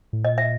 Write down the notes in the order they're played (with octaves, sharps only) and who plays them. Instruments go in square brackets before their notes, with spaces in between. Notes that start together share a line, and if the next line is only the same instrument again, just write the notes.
[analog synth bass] A2
[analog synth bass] A#2 [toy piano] D#5
[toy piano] E5